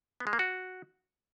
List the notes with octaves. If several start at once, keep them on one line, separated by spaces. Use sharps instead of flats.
B3
G#3
A#3
F#4